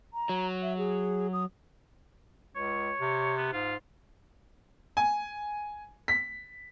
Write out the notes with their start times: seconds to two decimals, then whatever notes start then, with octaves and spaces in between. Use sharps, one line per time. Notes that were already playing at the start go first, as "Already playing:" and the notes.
0.14 A#5
0.29 F#3
0.62 E5
0.78 G#4
1.33 D#6
2.56 C#2 C#5
3.00 C3
3.37 B3
3.53 G#2 F4
4.97 G#5
6.08 B6